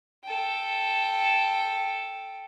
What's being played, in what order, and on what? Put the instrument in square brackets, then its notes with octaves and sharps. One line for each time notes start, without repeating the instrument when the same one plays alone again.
[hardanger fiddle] A4 G5